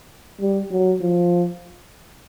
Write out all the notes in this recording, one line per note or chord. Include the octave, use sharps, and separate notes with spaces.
G3
F#3
F3